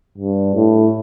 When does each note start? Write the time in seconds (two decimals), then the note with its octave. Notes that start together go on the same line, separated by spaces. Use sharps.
0.18 G2
0.55 A2